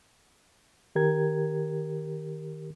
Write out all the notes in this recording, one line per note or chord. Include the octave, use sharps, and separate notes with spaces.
D#3 G4 A#4 G#6